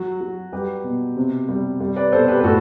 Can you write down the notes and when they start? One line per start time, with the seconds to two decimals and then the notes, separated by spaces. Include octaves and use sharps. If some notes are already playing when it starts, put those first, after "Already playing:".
Already playing: F#3 F#4
0.20 F#3
0.53 G3 G4 B4
0.84 B2
1.16 C3
1.48 G3
1.80 G3
1.96 B4 D5
2.12 B2 A4 C5
2.28 G4 B4
2.40 B4
2.44 A2 F#4 A4